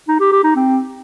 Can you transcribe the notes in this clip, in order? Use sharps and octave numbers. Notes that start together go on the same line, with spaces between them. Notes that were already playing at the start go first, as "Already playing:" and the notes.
D#4
G4
G4
D#4
C4